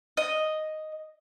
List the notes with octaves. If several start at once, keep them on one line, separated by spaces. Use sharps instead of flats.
D#5